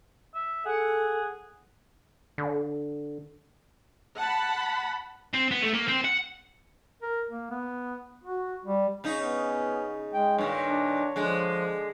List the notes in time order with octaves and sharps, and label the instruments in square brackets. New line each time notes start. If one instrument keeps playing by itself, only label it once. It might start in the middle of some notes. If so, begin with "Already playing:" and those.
[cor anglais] E5
[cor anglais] G#4 [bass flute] A4 [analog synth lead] F#5
[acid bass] D3
[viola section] F#5 A5 B5
[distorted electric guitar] C4
B3
A3
A#3
C4
F#5
[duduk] A#4
A#3
B3
F#4
G3
[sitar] C#3 D#4
[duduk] B3 [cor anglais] C#4
[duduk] G#3 [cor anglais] G5
[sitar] G2 A#2 D#3 [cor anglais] C#5
[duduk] D4
[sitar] D3 G#3 [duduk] F3